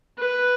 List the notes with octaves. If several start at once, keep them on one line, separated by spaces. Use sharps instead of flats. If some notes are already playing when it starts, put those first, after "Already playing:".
B4